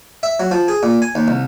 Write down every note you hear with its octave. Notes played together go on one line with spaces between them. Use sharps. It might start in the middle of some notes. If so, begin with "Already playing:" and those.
E5
F#3
F3
G#4
A#2
G#5
D#2
C2